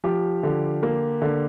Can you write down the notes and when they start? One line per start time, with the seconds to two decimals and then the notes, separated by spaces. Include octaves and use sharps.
0.04 F3 G4
0.43 D3
0.83 A#3
1.22 D3